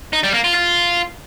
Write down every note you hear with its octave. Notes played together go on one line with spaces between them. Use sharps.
D#4
G3
A#3
F4
F4